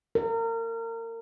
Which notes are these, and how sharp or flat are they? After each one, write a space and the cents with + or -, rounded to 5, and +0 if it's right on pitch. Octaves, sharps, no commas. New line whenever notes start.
A#4 -30